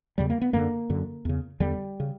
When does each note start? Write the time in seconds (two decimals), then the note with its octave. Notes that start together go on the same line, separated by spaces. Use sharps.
0.18 E2 C#3 G3
0.30 A#3
0.41 B3
0.53 F#2 D3 A#3
0.90 F#2 D3
1.25 E2 C#3
1.60 E2 D3 G3
2.00 C#3